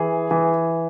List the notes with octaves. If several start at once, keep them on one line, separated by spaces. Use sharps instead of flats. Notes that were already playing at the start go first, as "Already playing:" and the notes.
Already playing: E3 G#4
E3